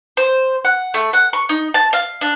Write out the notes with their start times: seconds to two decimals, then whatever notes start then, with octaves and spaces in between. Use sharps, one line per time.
0.17 C5
0.65 F#5
0.94 A3
1.13 F#5
1.33 C#6
1.49 D#4
1.74 A5
1.93 F5
2.21 D4